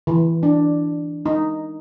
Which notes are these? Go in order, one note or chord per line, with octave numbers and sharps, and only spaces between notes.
E3
D4
D#4